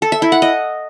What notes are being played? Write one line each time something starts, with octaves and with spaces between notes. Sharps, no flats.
A4
E5
E4
F#5
D#5